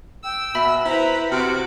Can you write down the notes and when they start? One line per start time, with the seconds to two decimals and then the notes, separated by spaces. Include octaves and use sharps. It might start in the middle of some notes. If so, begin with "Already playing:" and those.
0.24 G5 E6
0.55 B2 E5 B5
0.86 E4 B4 C5 A#5
1.32 C3 F#4 D6 F6